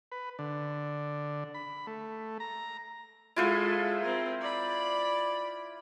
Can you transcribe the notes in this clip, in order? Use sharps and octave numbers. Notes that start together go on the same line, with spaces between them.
B4
D3
B5
A3
A#5
G#3 E4 F4 A4 C5
C4 A#4
D5 B5